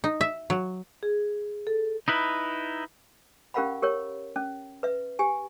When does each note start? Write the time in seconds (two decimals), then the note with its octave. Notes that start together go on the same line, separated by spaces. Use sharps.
0.04 D#4
0.21 E5
0.50 F#3
1.03 G#4
1.67 A4
2.08 D#4 E4 B4
3.54 C#4 G4 A#4 F5 F#5 B5
3.82 G4 A#4 C#5
4.36 C#4
4.83 B4 E5
5.19 G4 G#5